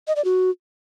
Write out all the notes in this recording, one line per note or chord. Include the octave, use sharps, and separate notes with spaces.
D#5
D5
F#4